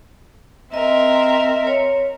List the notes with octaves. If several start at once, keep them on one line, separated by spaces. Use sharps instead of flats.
C4 A#4 D#5 E5
C#5